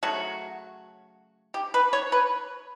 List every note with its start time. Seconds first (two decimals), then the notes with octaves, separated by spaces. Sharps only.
0.03 C#3 F#3 A3 F#4
1.54 G4
1.74 B4
1.93 C#5
2.12 B4